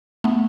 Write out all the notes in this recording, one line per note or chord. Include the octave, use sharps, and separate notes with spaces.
A3 B3